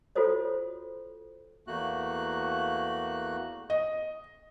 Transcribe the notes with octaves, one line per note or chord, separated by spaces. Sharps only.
F4 F#4 A4 C5 C#5
E2 A3 A#3 F#4 F#6
D#5